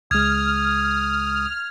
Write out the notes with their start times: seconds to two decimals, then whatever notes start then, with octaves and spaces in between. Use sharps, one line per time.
0.11 C#2 G#3 D#6 F6 G#6